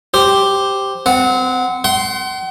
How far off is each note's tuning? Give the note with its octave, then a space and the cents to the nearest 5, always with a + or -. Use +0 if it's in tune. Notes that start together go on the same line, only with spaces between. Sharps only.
G4 +0 C5 +0
C4 -25 F#5 +0
F#5 +45 C6 +0